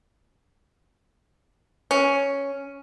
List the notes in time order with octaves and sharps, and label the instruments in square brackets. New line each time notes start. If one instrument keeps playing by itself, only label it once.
[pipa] C#4